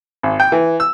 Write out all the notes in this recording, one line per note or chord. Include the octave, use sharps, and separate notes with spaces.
G#1
G5
E3
E6